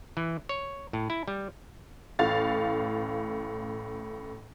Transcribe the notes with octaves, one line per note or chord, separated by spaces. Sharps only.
E3
C#5
A2
E4
G3
A1 A2 F5 A6